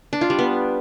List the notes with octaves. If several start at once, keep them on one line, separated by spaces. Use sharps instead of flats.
D4
F4
G3
B3